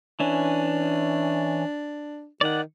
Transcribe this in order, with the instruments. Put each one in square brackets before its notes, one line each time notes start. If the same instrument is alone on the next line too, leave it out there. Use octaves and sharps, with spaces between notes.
[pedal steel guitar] E3 C#4 [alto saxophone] D4
[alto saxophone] D#3 [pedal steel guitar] D5 F#5